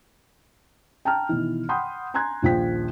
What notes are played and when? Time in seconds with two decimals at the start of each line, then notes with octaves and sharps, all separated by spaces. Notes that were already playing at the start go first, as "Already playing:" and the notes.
1.05 G5 A5 A#5 F6
1.29 B2 D#3 E3
1.69 F#5 G5 B5 C6 D#6 G6
2.14 G#5 A#5 C6 F#6 G#6
2.42 D#1 A#1 F3 G5 B6